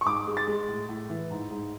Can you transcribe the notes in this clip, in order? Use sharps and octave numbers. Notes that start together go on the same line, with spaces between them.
C#6
G#2 D6
G#3
A6
G#3
A2
A2
E3
G#2
G#2